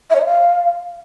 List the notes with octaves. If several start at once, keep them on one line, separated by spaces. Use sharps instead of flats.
E5
C#5
D#5
F5